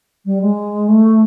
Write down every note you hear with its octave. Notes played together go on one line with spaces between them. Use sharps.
G3
G#3
A3